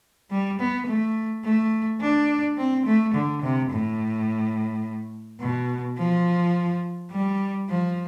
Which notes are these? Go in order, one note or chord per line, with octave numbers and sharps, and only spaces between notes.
G3
B3
A3
A3
D4
C4
A3
D3
C3
A2
B2
F3
G3
F3